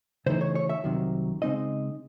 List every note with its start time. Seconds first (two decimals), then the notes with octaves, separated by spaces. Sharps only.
0.26 C#3 E3 A3 D#4 C5
0.41 C#5
0.55 C#5
0.69 E5
0.84 C2 C3 D#3 F#3
1.42 C#3 G#3 C4 D#4 D#5